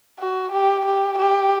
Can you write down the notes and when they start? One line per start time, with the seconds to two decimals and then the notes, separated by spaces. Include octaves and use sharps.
0.19 F#4
0.52 G4
0.85 G4
1.19 G4